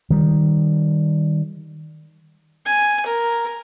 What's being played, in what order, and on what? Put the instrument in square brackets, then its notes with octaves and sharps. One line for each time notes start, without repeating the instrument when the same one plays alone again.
[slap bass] D#3 G3
[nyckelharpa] G#5
A#4